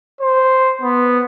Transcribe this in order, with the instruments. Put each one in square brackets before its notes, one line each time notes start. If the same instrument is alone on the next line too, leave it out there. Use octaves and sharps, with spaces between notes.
[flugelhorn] C5
B3